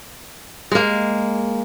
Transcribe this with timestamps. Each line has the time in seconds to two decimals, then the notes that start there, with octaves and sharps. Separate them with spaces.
0.72 G#3 A#3